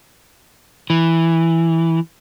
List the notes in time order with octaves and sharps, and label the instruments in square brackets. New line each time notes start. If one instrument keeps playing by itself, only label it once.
[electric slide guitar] E3